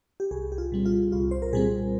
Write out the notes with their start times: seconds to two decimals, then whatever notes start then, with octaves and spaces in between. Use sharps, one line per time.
0.20 G4
0.31 C2 G#4
0.52 G4
0.58 F4
0.72 A#2 G3 C4
0.86 F4
1.12 C2 F4
1.31 C5
1.42 A#4
1.53 A#2 G3 C4 G#4